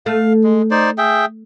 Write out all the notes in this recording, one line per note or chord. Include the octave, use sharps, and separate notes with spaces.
A3 F5
G#3
D#4 C5 D5
G#4 E5 G5